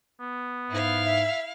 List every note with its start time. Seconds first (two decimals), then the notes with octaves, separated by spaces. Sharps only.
0.20 B3
0.71 G#2 E4 F5
1.05 E5